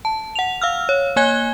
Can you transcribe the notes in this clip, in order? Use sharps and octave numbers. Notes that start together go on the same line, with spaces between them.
A5
F#5 F7
F5 E6 F6
C#5
A#3 C#5 G#5 F#6 G#6 G7